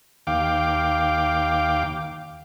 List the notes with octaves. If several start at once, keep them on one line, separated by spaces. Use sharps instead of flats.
D#2 F5 G5 D6